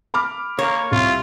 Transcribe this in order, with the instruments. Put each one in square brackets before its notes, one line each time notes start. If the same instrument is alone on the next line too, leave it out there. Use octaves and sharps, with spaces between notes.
[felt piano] B5 D6 F6
[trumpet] A#3 [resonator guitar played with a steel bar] C#5
[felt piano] C2 [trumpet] F4